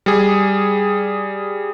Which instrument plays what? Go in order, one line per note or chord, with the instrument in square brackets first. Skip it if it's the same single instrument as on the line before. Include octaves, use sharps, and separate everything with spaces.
[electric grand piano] G3 G#4